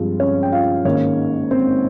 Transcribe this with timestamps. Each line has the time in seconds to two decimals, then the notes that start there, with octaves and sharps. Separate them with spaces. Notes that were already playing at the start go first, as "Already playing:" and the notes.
Already playing: G2 F3 G#3 C4 F4
0.20 C#4 C#5
0.43 G5
0.52 F4 F5
0.85 G#1 G#2 D#3 A#3 C#4 C#5
1.51 C4 C5